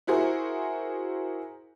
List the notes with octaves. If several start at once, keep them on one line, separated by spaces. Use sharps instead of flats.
E4 F#4 G#4 A#4 C5